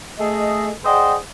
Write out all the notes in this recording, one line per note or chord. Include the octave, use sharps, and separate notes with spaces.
A3 G#4 D#5
G#4 C5 D5 D#5 F#5 G5